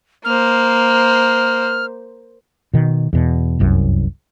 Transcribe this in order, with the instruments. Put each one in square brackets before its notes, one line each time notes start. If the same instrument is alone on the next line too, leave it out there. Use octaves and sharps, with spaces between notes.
[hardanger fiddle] A#3 C5 [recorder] F6
[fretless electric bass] B2 D#3
E2 B2
F1 C2 F#2